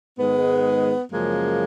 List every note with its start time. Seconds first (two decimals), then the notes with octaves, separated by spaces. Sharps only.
0.18 G#2 D#3 G#3 B3
1.11 F#2 C#3 F3 G#3 A#3